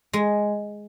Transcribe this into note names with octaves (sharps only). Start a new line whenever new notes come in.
G#3